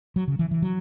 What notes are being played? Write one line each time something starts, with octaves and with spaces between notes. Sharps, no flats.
F#3
C#3
E3
E3
F#3